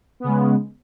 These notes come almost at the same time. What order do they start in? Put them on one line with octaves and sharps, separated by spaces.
B3 C#3 G#3